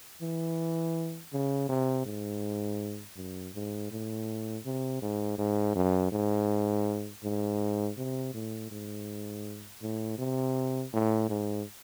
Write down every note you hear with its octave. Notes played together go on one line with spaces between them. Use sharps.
E3
C#3
C3
G#2
F#2
G#2
A2
C3
G#2
G#2
F#2
G#2
G#2
C3
A2
G#2
A2
C3
A2
G#2